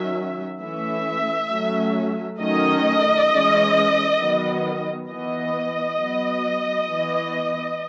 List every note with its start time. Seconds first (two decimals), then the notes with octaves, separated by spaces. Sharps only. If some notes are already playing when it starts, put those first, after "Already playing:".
Already playing: D#3 F#3 C#4 E5
0.59 E3 A3 C#4 E5
1.49 F#3 A3 C#4
2.40 D#3 F#3 A3 C#4 D#5
3.29 E3 G#3 C#4
4.20 D#3 F#3 B3
5.09 E3 B3 D#5
6.00 F#3 B3
6.89 E3 B3